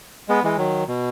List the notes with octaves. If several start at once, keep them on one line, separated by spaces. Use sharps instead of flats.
G#3 B3
E3 G#3
D#3 F#3
B2